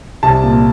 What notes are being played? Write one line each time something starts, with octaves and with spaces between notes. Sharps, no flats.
C2 A5
A#2